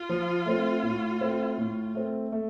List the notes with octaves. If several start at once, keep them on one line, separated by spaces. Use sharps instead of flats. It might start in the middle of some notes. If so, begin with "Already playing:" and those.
Already playing: F4
F3
A3 C4
A2
A3 C4
A2
A3 C4
A3